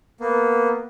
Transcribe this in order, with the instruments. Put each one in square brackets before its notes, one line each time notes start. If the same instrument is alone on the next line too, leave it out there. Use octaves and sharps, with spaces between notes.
[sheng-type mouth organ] A#3 B3